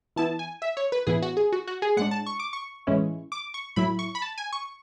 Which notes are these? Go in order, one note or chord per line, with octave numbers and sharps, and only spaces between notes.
E3 B3 E4 A5
G#5
E5
C#5
B4
A2 E3 B3 E4 G#4
F#4
G#4
F#4
F#4
G#4
A2 G#3 D4 F#5
A5
C#6
D6
C#6
A2 E3 G#3 C#4 E4
D6
C#6
A2 F#3 A3 E4 B5
C#6
B5
A5
G#5
C#6